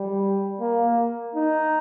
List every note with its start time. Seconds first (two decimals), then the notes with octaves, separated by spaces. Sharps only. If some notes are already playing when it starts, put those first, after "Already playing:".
Already playing: G3
0.60 A#3
1.35 D#4